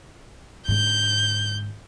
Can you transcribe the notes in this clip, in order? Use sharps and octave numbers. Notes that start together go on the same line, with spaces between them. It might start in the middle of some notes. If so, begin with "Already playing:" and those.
G#2 D3 G6